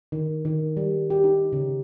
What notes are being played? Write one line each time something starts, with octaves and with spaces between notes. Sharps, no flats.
D#3
D#3
G3
G4
D#4
C#3